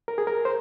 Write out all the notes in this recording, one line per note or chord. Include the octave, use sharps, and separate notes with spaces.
A#4
G#4
A#4
C5